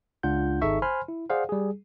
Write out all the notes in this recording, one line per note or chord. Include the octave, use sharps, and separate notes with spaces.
C#2 D4 F4 F#5 G6
G#1 D#4 G#4 A4 E5 C#6
C5 G#5 B5 C6 F6
E4
G#4 C5 D5 F5 F#5
G3 G#4